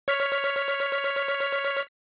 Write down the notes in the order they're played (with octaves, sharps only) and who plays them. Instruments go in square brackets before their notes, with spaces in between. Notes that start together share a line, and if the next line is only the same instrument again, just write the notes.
[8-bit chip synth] C#5 F6 B6